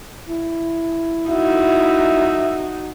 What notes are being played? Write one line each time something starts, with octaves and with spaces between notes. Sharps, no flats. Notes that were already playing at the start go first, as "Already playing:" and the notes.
E4
D#4 F#4 E5